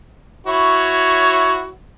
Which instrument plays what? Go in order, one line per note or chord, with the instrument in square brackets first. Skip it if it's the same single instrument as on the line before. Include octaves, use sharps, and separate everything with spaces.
[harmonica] E4 F#4 C#5